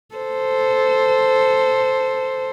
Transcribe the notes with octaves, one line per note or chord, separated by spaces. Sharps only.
A4 C5